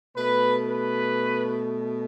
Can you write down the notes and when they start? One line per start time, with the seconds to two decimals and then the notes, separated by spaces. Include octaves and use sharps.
0.15 B2 A3 B4
0.70 B4